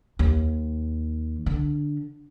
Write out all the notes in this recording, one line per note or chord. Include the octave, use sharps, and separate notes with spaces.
D#2
D3